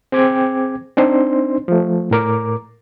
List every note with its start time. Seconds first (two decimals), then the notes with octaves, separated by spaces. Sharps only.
0.12 C4 G#4 G5 D6 G#6
0.97 C4 D4 D#4 C5 C6
1.68 F3 A3
2.11 A2 A#4 D6